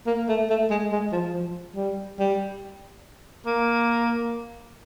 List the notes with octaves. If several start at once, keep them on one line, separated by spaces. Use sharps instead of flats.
A#3
A3
A3
G#3
G#3
F3
F3
G3
G3
A#3